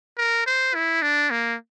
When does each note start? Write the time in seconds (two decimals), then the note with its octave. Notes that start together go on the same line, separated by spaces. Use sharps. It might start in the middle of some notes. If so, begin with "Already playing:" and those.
0.18 A#4
0.47 C5
0.75 E4
1.02 D4
1.31 A#3